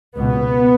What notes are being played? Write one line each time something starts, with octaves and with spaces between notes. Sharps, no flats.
C#2 B2 B3